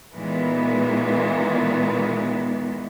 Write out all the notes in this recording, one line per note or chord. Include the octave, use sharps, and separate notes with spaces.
A#2 D#3 E3 G#3 B3